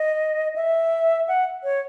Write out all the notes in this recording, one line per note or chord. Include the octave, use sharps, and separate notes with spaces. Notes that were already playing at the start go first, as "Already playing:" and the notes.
Already playing: D#5
E5
F#5
C#5